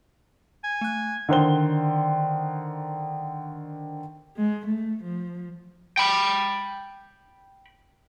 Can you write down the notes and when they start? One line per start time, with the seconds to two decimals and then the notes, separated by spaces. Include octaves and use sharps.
0.64 G#5
0.81 A3 F#6
1.29 D3 D#3 C5 G7
4.37 G#3
4.66 A3
5.03 F3
5.97 G5 B5